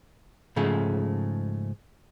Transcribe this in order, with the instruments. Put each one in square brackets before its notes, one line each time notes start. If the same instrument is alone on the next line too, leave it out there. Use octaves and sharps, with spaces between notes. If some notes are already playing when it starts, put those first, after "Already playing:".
[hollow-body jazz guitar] G#2 C#3 F3 G#3 A3